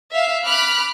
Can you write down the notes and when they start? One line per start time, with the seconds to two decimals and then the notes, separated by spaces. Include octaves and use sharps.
0.11 E5 F5
0.44 B5 D6 F6 F#6